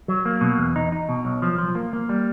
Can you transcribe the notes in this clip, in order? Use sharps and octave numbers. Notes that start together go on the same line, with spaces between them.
F#3
A#3
B2
E2
D#4
D#4
B2
B1
F3
F3
A#3
A#3
G3